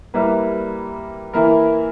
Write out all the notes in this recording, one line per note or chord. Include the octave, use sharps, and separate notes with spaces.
G3 A#3 E4 B4
E3 A#3 E4 A#4